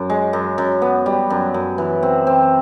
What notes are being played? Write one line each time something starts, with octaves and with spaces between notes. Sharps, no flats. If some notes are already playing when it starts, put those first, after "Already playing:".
Already playing: F#2
G#3
F#2
F#2
B3
G3
F#2
F#2
E3
C4
C4